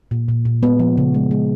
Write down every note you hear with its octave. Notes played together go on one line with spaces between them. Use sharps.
A#2
A#2
A#2
G#3 B3
F3
C#3
G#3
G#3